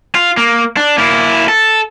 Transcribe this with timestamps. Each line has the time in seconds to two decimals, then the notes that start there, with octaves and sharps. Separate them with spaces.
0.15 F4
0.37 A#3
0.77 D4
0.98 A#3 E4
1.49 A4